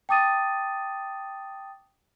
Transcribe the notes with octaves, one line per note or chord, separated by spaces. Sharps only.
G5 A5 D6 D#6 A6 D#7